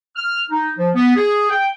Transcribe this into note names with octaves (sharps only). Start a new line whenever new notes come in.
F6
D#4
F3
B3
G#4
G5